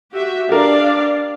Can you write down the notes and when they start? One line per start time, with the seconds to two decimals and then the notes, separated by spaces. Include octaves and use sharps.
0.13 F#4 G4 E5
0.49 D4 G4 A#4 D5 F5